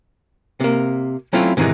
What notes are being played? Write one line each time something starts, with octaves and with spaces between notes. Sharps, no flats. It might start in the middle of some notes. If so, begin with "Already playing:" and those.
C3 A#3
F#3 A3 C4 C#4 E4 F4
G#2 C3 D#3 E3 G#3 D#4